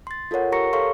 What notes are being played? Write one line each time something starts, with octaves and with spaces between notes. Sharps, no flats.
C6 A6
F4 A4 A#4 C#5 F#5
G4 A#4 A#5 C#6 A#6 C#7
A4 C#5 F5 C6 C#6